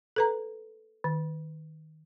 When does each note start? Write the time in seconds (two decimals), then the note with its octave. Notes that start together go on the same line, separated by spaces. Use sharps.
0.16 A4 B4 A#5
1.04 D#3